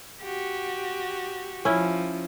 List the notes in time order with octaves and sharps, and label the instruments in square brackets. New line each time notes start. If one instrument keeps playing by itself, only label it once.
[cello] F#4 G4
[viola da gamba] F3 [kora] C#4 E4